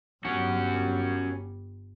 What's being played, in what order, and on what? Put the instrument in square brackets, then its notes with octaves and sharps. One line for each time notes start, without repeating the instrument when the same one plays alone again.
[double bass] G1 G3 [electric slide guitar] C#4 F#4